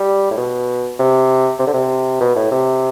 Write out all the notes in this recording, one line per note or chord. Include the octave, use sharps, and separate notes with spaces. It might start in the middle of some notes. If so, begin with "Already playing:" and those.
Already playing: G3
A2
B2
C3
C3
D3
C3
B2
A2
C3